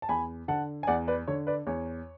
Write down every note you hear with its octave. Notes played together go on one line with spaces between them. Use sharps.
A5
E2 G#5 B5
D3 F#5 A5
G#5
E2 D5 F#5
B4 D5
D3 C#5
B4 D5
E2 C#5